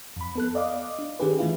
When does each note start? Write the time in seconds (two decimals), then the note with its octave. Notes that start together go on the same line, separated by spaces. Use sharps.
0.16 F2 B5
0.35 B3 A4 F#6
0.55 D5 D#5 F5 D6
0.99 D4
1.19 D#3 C#4 D#4 G4 G#4 B4
1.39 E3 A3 E4 F4